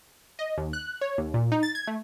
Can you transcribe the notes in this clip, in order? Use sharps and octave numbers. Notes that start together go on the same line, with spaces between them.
D#5
D#2
F#6
C#5
D#2
A#2
D#4
A6
G#6
A3